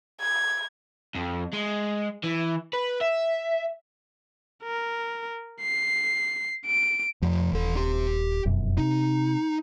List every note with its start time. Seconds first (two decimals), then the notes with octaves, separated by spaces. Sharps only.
0.21 G#6
1.15 F2
1.53 G#3
2.24 E3
2.73 B4
3.01 E5
4.64 A#4
5.62 C7
6.66 D7
7.22 F2 F3 A3
7.53 D#1 E3 A4
7.76 G4 C6
8.45 F1 F#2 B2
8.77 C3 D#4